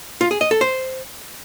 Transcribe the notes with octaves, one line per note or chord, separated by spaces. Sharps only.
F4
G#4
D#5
A4
C5